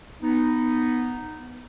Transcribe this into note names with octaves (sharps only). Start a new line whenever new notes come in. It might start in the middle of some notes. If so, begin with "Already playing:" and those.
B3 D#4